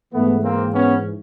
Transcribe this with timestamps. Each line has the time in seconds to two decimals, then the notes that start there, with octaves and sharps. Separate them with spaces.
0.13 G#2 E3 A3 B3
0.43 A#3 C4
0.74 B3 C#4